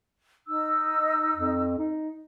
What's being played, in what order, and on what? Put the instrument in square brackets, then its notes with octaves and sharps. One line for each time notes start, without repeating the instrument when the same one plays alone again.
[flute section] D#4 E6
[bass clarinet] F2
D#4